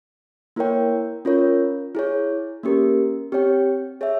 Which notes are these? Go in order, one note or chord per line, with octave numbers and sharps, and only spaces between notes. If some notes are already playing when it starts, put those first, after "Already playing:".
A#3 E4 A#4 C#5 G5
C#4 F4 A#4 C#5
E4 G#4 C#5
A#3 C#4 G4 A#4
C4 G4 C#5 G5
G#4 C#5 E5